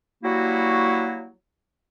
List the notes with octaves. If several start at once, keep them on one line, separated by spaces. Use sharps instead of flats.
F#3 G3 A#3 E4 F#4